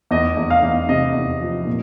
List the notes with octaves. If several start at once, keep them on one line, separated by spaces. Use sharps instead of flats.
E2 D#5
E2
F5
E2
C3 D#5
E2
F3
A#2